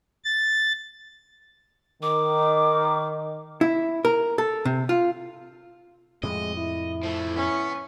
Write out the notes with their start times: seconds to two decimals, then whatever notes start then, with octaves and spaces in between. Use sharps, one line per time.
0.24 A6
2.03 D#3 D6
3.61 E4
4.05 A#4
4.38 A4
4.65 C3
4.89 F4
6.23 F2 A2 C3 G#3 D#5
6.57 E4
7.03 F3 A3
7.36 B3 C#4